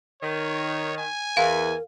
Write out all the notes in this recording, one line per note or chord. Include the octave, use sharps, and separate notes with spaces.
D#3 C#5
G#5
E2 E3 A#4 F5